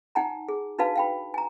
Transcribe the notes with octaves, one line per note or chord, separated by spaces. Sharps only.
D#4 F#5 G#5 A#5
G#4
D4 D#4 F#4 B4 F5 A5
F5 G5 B5
G#5 A#5